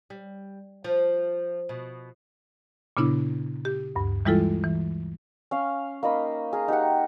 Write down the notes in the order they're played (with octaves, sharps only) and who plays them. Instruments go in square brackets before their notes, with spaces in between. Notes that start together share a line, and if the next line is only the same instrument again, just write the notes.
[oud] G3
F3
B2
[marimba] A#2 C#3 B3 D4 E4
G4
D2 G2
E3 G3 G#3 E4 F4 A4
E3
[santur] C#4 F5
A#3 D#4 D#5 B5
G#4 A#4
D#4 G4 D#5 F#5